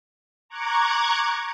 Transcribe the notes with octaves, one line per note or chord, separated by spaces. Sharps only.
A#5 C#6 D6 F#6 G#6